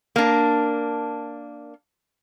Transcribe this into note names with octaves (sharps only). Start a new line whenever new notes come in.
A#3 D4